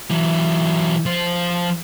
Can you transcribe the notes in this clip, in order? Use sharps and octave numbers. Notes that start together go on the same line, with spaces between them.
E3 F#3
F3 C5